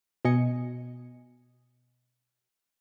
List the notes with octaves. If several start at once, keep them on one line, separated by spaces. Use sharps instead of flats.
B2 D#5 G#5 C#7